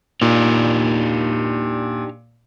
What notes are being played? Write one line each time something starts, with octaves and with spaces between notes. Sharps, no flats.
A#2 D4 D#4 G4